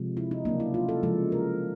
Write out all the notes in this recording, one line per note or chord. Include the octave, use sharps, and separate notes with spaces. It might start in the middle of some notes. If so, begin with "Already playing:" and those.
Already playing: C3 F3 G#3
E4
D#4
C#3 F#3 A#3 D4
E4
F4
A4
C#3 F3 G#3 A4
A#4